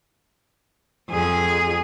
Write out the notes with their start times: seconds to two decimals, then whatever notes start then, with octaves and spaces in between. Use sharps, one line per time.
1.09 F2 G#4